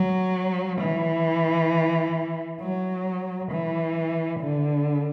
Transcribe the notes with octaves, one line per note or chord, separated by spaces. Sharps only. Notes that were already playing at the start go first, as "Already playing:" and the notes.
Already playing: F#3
E3
F#3
E3
D3